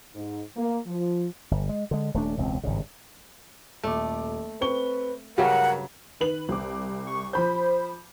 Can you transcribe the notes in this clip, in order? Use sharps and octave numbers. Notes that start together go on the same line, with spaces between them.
G#2
A#3
F3
G1
G#3
D3 G#3
D#1 A3 D4
E1 C#2 C4
G#1 G2 C#3
D#1 A3 D6
C4 B4 C#6 G7
G2 C#3 F#3 G4 A#4 C#5 F#5
D#3 B4 F#7
C2 D6
C#6
F3 C5 B5 G6